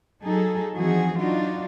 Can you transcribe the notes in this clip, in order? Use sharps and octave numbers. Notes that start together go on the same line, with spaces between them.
F#3 D#4 G#4 A4
E3 F3 C4 D#4 F#4 G#4
F#3 D4 D#4 F4 F#4